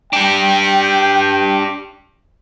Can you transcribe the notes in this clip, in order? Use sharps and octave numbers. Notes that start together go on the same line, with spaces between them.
D4 G4 G5